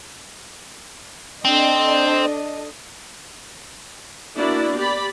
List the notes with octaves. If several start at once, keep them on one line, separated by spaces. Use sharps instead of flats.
C4 D4 A4 D#5
A#3 B3 D4 E4 F#4 D5
G4 D5 B5